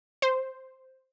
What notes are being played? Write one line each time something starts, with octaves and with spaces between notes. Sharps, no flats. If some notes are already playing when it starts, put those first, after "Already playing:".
C5